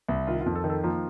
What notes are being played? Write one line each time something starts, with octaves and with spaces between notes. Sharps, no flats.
C2
D#3 F4
F4
F2
A4
D#3
A4
F3 A#3